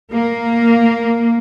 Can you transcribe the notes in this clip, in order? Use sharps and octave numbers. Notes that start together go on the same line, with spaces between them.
A#3